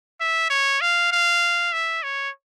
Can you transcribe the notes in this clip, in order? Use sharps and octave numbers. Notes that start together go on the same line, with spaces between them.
E5
C#5
F5
F5
E5
C#5